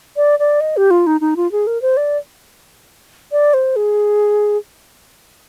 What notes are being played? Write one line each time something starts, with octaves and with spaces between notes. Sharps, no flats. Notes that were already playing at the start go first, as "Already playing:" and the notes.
D5
D5
D#5
G4
F4
D#4
D#4
F4
G#4
A#4
C5
D5
D5
C5
G#4